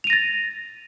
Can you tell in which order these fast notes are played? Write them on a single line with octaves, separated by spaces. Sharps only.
F7 D#7 A#6 A6